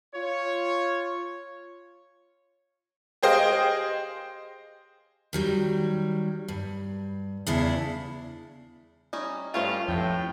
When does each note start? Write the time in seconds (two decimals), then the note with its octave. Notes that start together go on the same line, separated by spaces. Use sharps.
0.15 F4 C#5
3.23 G4 G#4 C5 D#5 F5 G5
5.33 D#3 F#3 G3
6.48 G2
7.47 E2 C#3 D4 E4
9.13 G3 C#4 D#4
9.54 G2 A3 C#4 F4 C5
9.88 F2 A2 G5